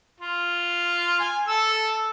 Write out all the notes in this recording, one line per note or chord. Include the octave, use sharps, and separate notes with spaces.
F4
G#5
A4 E6